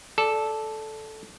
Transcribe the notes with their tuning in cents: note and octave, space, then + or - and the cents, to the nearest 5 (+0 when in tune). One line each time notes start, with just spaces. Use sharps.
A4 -10 D5 +0